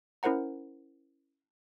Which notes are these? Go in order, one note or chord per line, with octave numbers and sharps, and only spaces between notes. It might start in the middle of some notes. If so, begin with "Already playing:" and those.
C#4 E4 A#4 C5 F#5 A#5